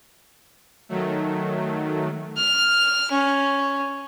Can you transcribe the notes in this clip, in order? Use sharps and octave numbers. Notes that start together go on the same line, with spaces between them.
D#3 F#3 A3
F6
C#4